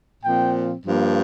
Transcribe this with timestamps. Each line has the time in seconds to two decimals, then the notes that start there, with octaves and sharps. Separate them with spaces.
0.22 A#2 F3 C4 G5
0.84 G2 F3 A#3